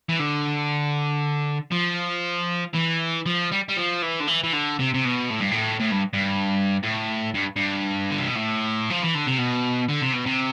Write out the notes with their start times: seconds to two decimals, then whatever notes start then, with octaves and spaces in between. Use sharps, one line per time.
0.09 E3
0.19 D3
1.72 F3
2.75 E3
3.26 F3
3.51 G3
3.69 G3
3.77 F3
4.02 E3
4.20 D3
4.27 E3
4.43 E3
4.53 D3
4.79 C3
4.94 C3
5.05 B2
5.30 A2
5.40 G2
5.51 A2
5.80 A2
5.92 G2
6.13 G2
6.83 A2
7.34 G2
7.56 G2
8.11 D3
8.19 C3
8.27 B2
8.35 A2
8.90 F3
9.02 E3
9.15 D3
9.27 C3
9.38 B2
9.89 D3
10.02 C3
10.13 B2
10.26 C3